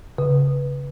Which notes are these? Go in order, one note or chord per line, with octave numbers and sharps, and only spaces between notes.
C#3